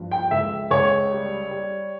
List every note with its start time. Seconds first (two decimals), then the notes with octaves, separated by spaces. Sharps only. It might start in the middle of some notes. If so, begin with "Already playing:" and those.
Already playing: G2 F3
0.11 G5
0.31 C#2 E5
0.71 C#2 C#5
1.11 G3
1.51 G3